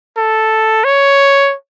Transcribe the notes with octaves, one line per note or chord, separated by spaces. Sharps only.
A4
C#5